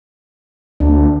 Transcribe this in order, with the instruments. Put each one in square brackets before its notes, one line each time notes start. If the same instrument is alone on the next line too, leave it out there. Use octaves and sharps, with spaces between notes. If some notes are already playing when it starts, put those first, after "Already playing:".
[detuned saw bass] D2 [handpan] D4